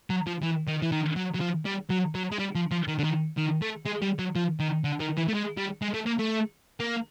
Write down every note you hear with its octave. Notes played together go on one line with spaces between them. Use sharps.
F#3
F3
E3
D#3
E3
D#3
F#3
F#3
F3
G3
F#3
F#3
G#3
G3
F3
F3
D#3
D3
D#3
D#3
A3
G#3
G3
F#3
F3
D#3
D3
D#3
E3
A3
G#3
G3
G#3
A3
A#3
A3
A#3